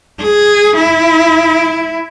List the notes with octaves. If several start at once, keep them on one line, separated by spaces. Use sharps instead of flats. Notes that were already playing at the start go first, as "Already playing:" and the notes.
G#4
E4